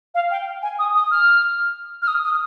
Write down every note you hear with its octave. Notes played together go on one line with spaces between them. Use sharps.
F5
G5
G#5
D#6
D#6
F6
F6
D#6
D#6